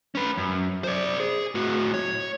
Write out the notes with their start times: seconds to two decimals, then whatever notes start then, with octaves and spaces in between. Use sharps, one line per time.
0.15 C#4 B4
0.37 F#2
0.84 C5 D5
1.20 G#4
1.55 A2 F#4
1.94 C#5